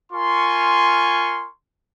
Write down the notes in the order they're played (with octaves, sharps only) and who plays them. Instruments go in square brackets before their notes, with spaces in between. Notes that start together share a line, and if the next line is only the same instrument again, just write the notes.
[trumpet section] F4 A#4 G#5 C6 C#6